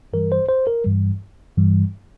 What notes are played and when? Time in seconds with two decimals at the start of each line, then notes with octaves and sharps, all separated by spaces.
0.13 G2 E3 G3 A#4
0.32 C5
0.49 C5
0.67 A#4
0.85 G2 E3 G3
1.57 G2 E3 G3